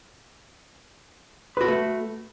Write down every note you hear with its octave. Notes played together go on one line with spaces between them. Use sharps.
A3 F#4 A4 B4